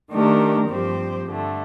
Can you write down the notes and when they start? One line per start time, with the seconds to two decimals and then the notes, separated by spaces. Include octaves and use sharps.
0.10 D#3 A3 D4 G4 A#4
0.68 G2 F3 C4 G4 C5
1.27 G2 D3 A3